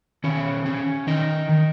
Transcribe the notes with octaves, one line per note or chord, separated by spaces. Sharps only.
D#3 C#4 C#5
C#4
D#3 D#4 D#5
D#3